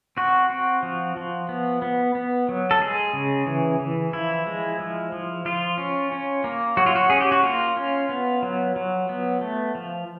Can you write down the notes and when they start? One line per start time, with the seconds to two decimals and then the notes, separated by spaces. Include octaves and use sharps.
0.17 C4 F#4
0.50 C4
0.83 F3
1.16 F3
1.49 B3
1.82 B3
2.15 B3
2.49 F#3
2.71 A4
2.80 G#3 G#4
3.13 C#3
3.47 E3
3.80 E3
4.13 F3 E4
4.46 G#3
4.80 F3
5.12 F3
5.45 F3 F4
5.78 C#4
6.12 C#4
6.44 A#3
6.77 F#3 F#4
6.86 F4
6.95 F#4
7.10 C#4 G#4
7.20 G4
7.32 F#4
7.43 A#3 F4
7.77 C#4
8.09 B3
8.43 F#3
8.76 F#3
9.09 B3
9.41 A3
9.75 F3